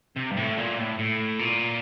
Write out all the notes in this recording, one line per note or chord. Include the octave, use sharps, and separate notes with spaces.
C3
G2
A2
A#2
A2
A2
A#2